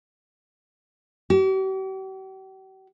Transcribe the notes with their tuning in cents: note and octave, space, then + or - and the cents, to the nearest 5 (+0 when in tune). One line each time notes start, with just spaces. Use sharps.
G4 -45